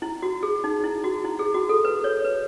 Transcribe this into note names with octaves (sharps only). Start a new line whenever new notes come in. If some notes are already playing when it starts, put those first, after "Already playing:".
E4
F#4
G#4
D#4
E4
F#4
E4
G#4
F#4
A4
B4
C#5
B4